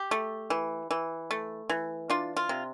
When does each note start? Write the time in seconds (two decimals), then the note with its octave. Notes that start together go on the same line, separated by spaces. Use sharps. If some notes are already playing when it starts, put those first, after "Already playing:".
Already playing: G4
0.11 A3
0.50 E3
0.91 E3
1.31 A3
1.69 E3
2.10 D4 F4
2.37 F4
2.49 C3